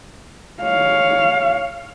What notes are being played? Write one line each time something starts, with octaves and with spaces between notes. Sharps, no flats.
C#5 F5